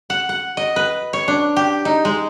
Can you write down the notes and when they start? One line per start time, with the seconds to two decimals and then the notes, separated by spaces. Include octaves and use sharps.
0.10 F#5
0.29 F#5
0.57 D#5
0.76 B4
1.13 C#5
1.28 D4
1.56 G4
1.85 D#4
2.05 G#3